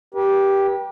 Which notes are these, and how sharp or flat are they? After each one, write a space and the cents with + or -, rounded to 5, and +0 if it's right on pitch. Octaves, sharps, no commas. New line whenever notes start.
G4 +0 B4 -45